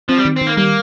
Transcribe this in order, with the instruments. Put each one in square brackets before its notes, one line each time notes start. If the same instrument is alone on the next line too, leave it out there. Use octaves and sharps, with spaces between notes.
[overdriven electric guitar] F3 [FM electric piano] C4
[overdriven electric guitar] G3
[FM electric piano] D#3
[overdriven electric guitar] C4
[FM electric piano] D#3
[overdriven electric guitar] A#3
[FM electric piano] G3 [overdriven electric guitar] A#3